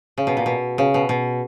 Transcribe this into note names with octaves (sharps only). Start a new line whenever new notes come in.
C#3
B2
A#2
B2
C#3
B2
B2